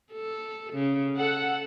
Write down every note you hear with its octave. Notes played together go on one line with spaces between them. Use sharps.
A4
C#3
A4 F#5